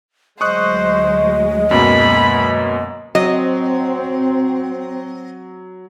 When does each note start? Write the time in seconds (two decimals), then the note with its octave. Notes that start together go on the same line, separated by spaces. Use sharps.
0.41 D2 F#3 G#3 C5 D#5 C#6 D#6 F#6
1.71 F#2 B2 A#3 B5
3.15 F#3 C4 D#5